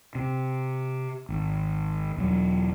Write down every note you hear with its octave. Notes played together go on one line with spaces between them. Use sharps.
C3
G#1
E1 F#3